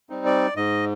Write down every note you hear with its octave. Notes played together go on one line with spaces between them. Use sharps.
G3 C4 D#4
D5
G#2 D#5